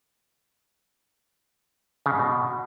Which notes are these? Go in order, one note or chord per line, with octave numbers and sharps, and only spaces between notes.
C#3
G#2
B2